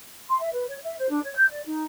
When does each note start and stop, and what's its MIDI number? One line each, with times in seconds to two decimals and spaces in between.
0.29 0.39 84
0.41 0.51 76
0.52 0.64 71
0.69 0.78 73
0.83 0.95 76
0.98 1.08 72
1.10 1.20 62
1.23 1.34 73
1.36 1.46 91
1.49 1.62 74
1.66 1.84 63